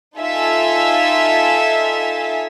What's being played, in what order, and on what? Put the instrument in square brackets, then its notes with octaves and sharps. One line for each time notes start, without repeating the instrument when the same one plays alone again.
[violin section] D#4 F4 A4 E5 G#5